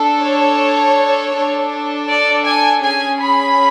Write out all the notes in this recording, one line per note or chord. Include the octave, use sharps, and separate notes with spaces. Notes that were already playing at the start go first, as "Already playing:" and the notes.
Already playing: D4 A4
C#5
D4 A4
D5
G#5
C#4 G#4 G#5
B5